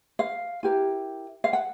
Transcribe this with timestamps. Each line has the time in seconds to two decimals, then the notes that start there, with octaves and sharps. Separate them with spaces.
0.19 F5
0.63 E4 G4 A#4
1.44 F5
1.53 F#5